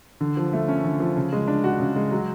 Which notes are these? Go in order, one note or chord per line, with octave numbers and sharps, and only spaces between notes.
D3
F3
A3
C#4
D3
F3
C#3
G#3
D4
F#4
C#3
G#3
F#3